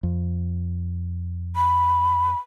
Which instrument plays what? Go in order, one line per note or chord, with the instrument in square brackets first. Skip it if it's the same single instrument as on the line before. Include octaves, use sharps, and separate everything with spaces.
[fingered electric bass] F2
[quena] B5